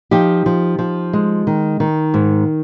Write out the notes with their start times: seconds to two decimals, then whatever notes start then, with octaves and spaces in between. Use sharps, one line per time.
0.11 F3 D#4 G4
0.46 F3
0.79 F3
1.13 G#3
1.47 D#3
1.80 D#3
2.14 G#2